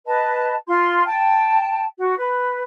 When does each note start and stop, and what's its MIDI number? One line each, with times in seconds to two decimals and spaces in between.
0.06 0.54 71
0.06 0.54 75
0.06 0.54 81
0.67 1.03 65
0.67 1.03 84
1.05 1.84 79
1.05 1.84 81
1.98 2.15 66
2.18 2.62 71